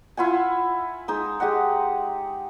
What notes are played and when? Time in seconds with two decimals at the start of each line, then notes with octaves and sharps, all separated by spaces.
0.17 E4 F4 F#5 G#5
1.08 G#3 D#4 E6
1.40 G#3 G4 D#5 F#5